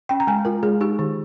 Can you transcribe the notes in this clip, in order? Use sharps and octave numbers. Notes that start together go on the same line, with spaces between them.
C#4 G5
A#5
G#3 G#5
F4 A#4
G#3 G#4
D#4 G4
D#3